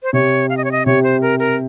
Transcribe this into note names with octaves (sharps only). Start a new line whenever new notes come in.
C5
C3 C#5
F5
D#5
C#5
D#5
C3 C#5
C5
A#4
A#4